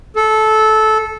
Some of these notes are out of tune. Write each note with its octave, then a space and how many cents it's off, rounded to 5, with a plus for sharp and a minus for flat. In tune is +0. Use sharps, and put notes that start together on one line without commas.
A4 -15